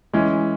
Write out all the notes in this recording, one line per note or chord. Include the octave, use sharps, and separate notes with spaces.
E3 G#3 C#4